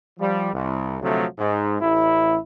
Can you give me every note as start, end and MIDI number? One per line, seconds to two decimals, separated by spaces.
0.19 0.51 53
0.19 0.51 55
0.53 0.97 36
1.01 1.24 38
1.01 1.24 48
1.01 1.24 53
1.01 1.24 54
1.01 1.24 57
1.38 1.75 44
1.80 2.37 33
1.80 2.37 64